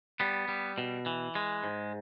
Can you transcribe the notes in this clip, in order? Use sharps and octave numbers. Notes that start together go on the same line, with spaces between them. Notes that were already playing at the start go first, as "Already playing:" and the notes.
G3 B3
G3
B2
E3
G#3
G#2